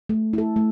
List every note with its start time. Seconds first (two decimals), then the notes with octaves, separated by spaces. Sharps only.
0.09 A3
0.33 E4 A4
0.56 A3